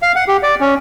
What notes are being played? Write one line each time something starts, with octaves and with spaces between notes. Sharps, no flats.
F5
F#5
G4
D5
C#4